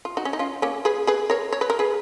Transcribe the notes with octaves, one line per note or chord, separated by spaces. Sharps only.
F4
D#4 F#4
C#4
D#4
C#4 F4
A#3 C#4
G#4 B4
G#4 B4
A#4 C#5
C#5
B4
A#4
G#4 B4